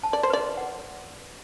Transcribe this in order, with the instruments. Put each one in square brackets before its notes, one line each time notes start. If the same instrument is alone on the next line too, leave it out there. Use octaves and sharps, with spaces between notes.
[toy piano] A5
[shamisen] D5
C5
[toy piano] B4 [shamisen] D5
[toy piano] F#5